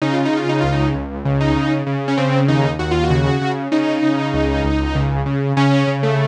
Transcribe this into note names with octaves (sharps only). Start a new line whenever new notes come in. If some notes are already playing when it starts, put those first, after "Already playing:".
C#3 D#4
F4
D#4
C#3 F4
D#4
C#2 F4
D#4
C#2
C#3
D#4
C#3
C#3
C#4
C#3 C4
D#2 D#4
D#2 F#4
F4
F#4
C#3
C#3
C#3 D#4
C#3
C#2
C#2
C#3
C#3
C#3 C#4
C#3
A3